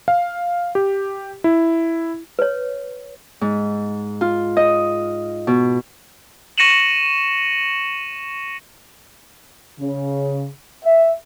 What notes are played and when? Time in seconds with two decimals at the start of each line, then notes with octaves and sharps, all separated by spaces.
0.08 F5
0.75 G4
1.44 E4
2.39 B4 C#5
3.41 G#2
4.21 F4
4.57 D#5
5.47 B2
6.58 C#6 A#6 C#7 D#7 E7 F#7
9.80 C#3
10.83 E5